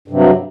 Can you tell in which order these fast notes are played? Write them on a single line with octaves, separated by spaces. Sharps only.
G2 C3 F#3